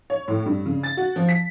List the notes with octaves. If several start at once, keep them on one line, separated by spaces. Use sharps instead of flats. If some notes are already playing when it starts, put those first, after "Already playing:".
C#5
A2
G2
C#3
A6
F#4
F3
B6